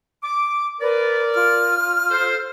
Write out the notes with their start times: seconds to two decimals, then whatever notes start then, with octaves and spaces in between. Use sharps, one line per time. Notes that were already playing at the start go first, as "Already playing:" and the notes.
0.23 D6
0.81 A#4 B4 D5
1.35 F4 F6
2.10 A4 C5